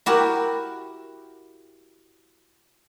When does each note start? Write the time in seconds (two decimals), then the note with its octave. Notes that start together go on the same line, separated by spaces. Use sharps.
0.06 E4 F#4 G4 A#4